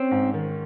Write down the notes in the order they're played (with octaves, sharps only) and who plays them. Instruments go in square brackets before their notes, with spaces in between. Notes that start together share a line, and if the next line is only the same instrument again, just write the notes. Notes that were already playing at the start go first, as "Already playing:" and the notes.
Already playing: [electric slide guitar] C4 [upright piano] C#4
[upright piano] G#2
D#3